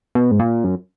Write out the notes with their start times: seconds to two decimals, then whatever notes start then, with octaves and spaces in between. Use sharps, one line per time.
0.15 B2
0.31 G#2
0.40 A#2
0.64 F#2